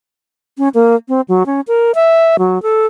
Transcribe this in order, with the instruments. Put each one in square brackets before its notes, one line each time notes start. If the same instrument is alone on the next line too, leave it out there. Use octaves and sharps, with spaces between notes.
[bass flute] C#4
A#3
C4
F#3
C#4
A#4
E5
F#3
A4